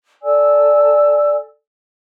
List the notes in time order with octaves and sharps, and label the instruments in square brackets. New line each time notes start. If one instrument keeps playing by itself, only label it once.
[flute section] A4 D5 G#5 E6